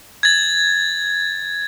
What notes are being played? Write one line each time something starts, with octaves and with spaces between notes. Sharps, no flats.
G#6 A6